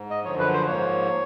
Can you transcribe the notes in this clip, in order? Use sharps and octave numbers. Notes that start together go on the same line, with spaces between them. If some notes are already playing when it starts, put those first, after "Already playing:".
Already playing: G#2
D#5
F#2 D3 F3 C#5
B4
C5
G#2 F3 A#3 C#5